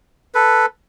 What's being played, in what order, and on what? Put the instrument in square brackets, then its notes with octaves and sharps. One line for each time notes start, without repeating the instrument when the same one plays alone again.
[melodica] A4 B4